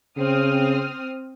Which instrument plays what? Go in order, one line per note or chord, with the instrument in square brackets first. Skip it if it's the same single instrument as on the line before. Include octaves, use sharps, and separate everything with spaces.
[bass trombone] C#3 [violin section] C4 D#6 F6